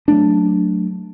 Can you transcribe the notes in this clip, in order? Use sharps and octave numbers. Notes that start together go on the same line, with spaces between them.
F#3 A3 D4